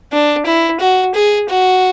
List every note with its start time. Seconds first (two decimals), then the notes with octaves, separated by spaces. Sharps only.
0.12 D4
0.46 E4
0.80 F#4
1.14 G#4
1.49 F#4